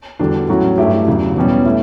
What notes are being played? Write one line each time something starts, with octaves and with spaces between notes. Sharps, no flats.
E2 D3 G3 D4 F#4
A2 F#3 C#4 F#4
G2 E3 A3 E4 G4
E2 C#3 F#3
E2 B2 G3 C#4
A3 E4